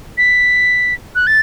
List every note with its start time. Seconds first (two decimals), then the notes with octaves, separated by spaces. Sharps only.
0.18 B6
1.15 F#6
1.27 A6